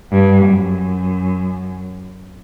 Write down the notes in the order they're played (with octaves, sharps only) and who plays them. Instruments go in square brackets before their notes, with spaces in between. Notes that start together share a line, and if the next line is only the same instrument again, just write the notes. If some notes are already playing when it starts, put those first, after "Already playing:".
[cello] G2
F#2